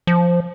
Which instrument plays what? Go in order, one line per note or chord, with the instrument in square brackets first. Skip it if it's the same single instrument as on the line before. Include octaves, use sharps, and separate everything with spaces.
[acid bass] F3